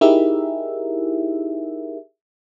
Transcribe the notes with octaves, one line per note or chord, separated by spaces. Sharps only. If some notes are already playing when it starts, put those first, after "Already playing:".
D#4 E4 G4 G#4 A#4 E5